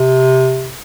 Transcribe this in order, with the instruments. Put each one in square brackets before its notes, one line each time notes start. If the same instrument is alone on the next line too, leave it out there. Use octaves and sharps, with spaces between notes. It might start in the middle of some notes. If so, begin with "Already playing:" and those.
Already playing: [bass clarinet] C3